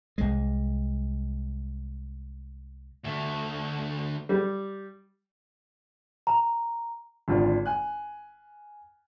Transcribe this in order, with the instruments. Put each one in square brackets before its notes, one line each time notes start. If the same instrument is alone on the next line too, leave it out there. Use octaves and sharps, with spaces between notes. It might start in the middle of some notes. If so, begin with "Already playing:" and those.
[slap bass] C2 G#3
[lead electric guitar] D2 A3
[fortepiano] G3
[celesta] A#5
[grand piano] G#1 D3 F4 D5
G#5 F#6